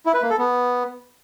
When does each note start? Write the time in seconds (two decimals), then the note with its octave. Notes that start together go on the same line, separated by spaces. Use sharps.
0.06 E4
0.14 B4
0.22 A#3
0.30 A4
0.38 B3